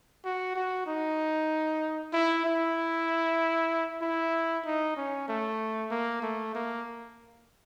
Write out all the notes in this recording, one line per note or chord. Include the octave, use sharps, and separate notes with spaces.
F#4
F#4
D#4
E4
E4
E4
D#4
C#4
A3
A#3
A3
A#3